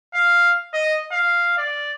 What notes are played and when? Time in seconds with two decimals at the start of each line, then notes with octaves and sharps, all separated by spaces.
0.14 F5
0.74 D#5
1.12 F5
1.58 D5